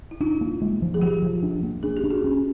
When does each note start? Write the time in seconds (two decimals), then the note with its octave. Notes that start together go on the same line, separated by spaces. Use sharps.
0.11 E4
0.21 D4 D#4 F4
0.41 A#3
0.61 G#3
0.82 F3
0.94 G#4
1.02 F3 F4 G4
1.22 F3
1.43 D4
1.63 A#3
1.83 D4 G#4
1.97 G4
2.04 D4
2.11 F#4 G#4
2.24 C#4